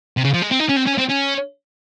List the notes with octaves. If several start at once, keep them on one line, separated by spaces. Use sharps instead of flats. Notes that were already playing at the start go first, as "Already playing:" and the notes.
C3
C#3
F3
G#3
C4
D#4
C#4
C4
C#4
C4
C#4